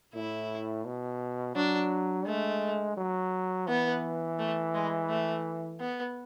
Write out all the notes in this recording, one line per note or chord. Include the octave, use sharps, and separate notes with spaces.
A2 E4
B2
F#3 D4
G#3 A3
F#3
E3 B3
A3
G#3
A3
B3